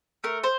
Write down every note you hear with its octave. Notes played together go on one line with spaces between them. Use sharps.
A3 A#4
C5